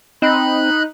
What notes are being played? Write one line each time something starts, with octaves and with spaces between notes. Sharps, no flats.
C4 D#4 B5 F#6